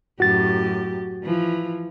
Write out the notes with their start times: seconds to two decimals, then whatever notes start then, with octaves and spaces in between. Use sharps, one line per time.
0.20 F#2 A2 F#4 G4 A6
1.23 E3 F3